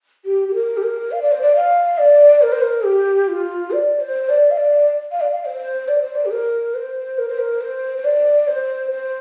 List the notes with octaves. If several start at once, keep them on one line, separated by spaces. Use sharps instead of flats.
G4
G4
A#4
G4
A#4
F5
D5
C5
D5
F5
D5
A#4
C5
A#4
G4
F4
D5
C5
D5
F5
D5
F5
D5
F5
C5
D5
C5
D5
G4
A#4
C5
A#4
C5
A#4
C5
C5
D5
C5
C5